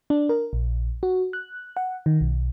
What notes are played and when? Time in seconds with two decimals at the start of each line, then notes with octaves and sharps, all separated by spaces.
0.10 D4
0.29 A#4
0.53 A#1
1.03 F#4
1.33 F#6
1.77 F#5
2.06 D#3
2.21 B1